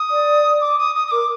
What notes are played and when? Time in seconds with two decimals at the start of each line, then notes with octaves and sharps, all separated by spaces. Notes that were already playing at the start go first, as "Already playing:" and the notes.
Already playing: D#6
0.10 D5
0.60 D6
0.78 D#6
0.95 D#6
1.07 D#6
1.11 A#4 D6